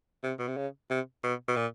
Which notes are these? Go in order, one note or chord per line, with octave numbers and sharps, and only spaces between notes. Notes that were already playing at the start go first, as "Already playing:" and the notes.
C3
B2
C3
C#3
C3
B2
B2
A#2